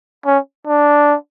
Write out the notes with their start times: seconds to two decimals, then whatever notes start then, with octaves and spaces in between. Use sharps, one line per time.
0.26 C#4
0.67 D4